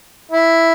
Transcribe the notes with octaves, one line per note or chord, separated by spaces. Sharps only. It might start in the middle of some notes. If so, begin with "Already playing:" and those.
E4